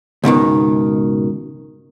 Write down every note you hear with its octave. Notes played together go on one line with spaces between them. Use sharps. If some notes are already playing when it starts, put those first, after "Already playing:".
C#2 G#2 B2 D#3